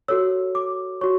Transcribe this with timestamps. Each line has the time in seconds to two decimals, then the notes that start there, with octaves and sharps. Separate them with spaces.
0.08 F#4 A4 C#5 E6
0.55 D6
1.01 F#4 C#5 C#6